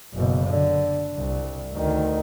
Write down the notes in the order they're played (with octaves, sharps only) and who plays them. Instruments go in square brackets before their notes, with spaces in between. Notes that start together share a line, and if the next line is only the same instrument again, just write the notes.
[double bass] F#1 B2
D3
C2
D2 D#3